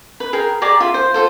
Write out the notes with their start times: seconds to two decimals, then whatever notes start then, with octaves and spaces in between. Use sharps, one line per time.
0.20 B4
0.33 G#4 A#4 G5
0.61 G4 G#4 D5 A#5
0.80 F4 E5
0.94 C5
1.14 F4 A4 C5